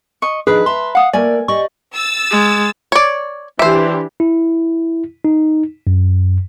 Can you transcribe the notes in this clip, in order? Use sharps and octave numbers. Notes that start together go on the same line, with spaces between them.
D#5 C#6
D#3 F3 D4 G#4 B4
E5 A5 A#5 C6
F5 F#5 D#6
A3 A#3 A#4 D5 G#5
G4 D5 D#5 C#6
E6 A6
G#3
C#5 D5
E3 D4 G4 C5 E5
E4
D#4
F#2